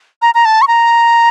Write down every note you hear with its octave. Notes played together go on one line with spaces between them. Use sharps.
A#5
A#5
A5
C#6
A#5